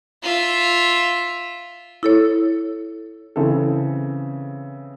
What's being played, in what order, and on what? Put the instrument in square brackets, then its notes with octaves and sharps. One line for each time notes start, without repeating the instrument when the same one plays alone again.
[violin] F4 E5
[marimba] E4 A4 C#5
[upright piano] C#3 E3 C4 A4